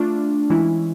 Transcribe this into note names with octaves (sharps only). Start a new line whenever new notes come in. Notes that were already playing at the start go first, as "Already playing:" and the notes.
Already playing: A3 D4 F4
E3 G#3 C#4 E4